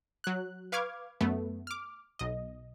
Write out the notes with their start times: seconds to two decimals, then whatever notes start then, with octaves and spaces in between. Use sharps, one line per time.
0.24 F#3 F#6
0.72 B4 F5 C#6 D6 F6 G#6
1.21 F#2 A3 B3
1.67 D6 F6
2.19 B1 D#5